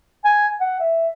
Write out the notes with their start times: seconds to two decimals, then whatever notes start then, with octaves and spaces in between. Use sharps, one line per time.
0.24 G#5
0.60 F#5
0.80 E5